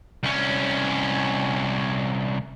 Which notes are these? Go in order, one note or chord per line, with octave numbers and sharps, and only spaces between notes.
C2 C#4